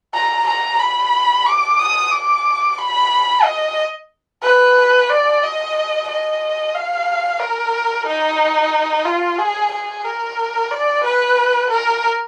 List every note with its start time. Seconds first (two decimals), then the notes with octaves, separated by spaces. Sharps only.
0.14 A#5
0.47 A#5
0.79 B5
1.46 D6
1.79 D#6
2.12 D6
2.79 B5
3.44 D#5
4.43 B4
5.10 D5
5.43 D#5
6.09 D#5
6.75 F5
7.40 A#4
8.07 D#4
9.05 F4
9.39 G#4
9.72 G#4
10.04 A#4
10.70 D5
11.04 B4
11.70 A#4